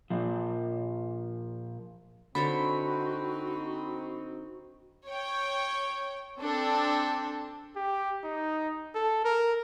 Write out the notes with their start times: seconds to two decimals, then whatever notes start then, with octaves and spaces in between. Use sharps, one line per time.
0.10 A#2 F3
2.35 D3 C4 D#4 F#4 C5 C#5 B5
5.06 C#5 G5
6.38 C4 D4 A4
7.76 G4
8.24 D#4
8.95 A4
9.25 A#4